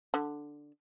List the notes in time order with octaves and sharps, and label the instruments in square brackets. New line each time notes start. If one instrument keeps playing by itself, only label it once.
[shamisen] D3